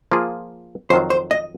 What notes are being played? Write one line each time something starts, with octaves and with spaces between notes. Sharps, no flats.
F3 A#3 F4 G#4
F2 D#3 F#3 C5
C5
D#5